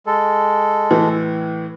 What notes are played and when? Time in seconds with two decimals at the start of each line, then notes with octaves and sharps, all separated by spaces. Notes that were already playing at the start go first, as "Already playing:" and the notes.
0.06 G#3 A4
0.90 A2 E3